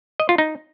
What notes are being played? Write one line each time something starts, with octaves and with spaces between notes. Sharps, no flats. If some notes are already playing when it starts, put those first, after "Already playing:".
D#5
F4
D#4